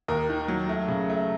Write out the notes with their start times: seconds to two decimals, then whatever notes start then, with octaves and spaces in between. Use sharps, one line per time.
0.08 D#2 A#4
0.29 D#3
0.48 F#3
0.69 A3
0.88 C#3
1.09 A3